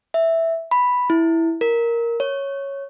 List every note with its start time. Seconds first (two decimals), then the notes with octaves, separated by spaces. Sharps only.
0.14 E5
0.71 B5
1.10 E4
1.61 A#4
2.20 C#5